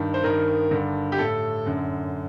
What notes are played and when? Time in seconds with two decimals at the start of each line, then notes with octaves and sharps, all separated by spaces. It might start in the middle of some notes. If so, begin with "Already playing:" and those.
Already playing: G2 D#3
0.14 C5
0.24 G2 D#3 A#4
0.71 G2 D3
1.12 G4
1.18 A2 A4
1.66 F#2 D3